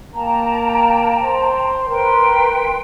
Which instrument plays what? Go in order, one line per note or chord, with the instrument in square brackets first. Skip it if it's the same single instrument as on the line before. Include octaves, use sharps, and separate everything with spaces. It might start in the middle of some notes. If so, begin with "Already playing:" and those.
[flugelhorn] A#3 [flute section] G5 A5 A#5
[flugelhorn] C5
[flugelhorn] A#4 [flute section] B4 G5 C6